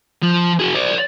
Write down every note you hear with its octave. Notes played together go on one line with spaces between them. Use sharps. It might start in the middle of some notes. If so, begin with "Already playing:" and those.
F3
F#4 G#4
C5 D5